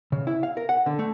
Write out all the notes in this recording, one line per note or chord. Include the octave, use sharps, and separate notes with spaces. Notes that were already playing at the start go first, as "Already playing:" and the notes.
C#3
E4
F5
A#4
F#5
D3
A3